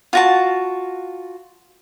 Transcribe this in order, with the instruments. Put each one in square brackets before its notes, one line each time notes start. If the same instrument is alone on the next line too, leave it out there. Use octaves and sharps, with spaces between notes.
[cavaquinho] F4 F#4 A5